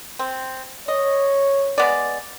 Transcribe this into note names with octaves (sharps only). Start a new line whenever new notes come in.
C4
C#5 D#5
G#3 B3 D5